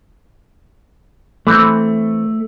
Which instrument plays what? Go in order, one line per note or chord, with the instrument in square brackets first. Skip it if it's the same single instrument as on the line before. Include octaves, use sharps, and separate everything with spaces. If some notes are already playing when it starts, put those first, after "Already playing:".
[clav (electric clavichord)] E3 C4 [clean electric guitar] A3